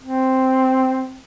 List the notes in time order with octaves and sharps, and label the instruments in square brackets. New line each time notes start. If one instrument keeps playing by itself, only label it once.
[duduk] C4